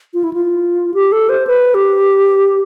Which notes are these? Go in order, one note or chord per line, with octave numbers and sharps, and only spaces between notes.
F4
E4
F4
G4
A4
C5
B4
G4